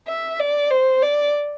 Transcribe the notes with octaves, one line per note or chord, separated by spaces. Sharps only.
E5
D5
C5
D5